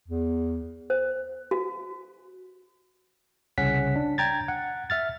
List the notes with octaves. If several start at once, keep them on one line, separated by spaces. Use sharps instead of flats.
E2
C5
F#4
C2 C#3 C#4 F#5 B6
D4
G5 A#5 G#6 A6
F#5
E5 F6 A6